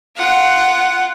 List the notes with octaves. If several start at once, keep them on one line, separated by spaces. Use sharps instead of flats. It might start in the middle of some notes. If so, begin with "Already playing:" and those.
F4 F#5